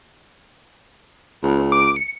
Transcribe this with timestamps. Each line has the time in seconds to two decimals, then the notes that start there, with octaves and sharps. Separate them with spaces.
1.43 C#2
1.72 D6
1.96 C#7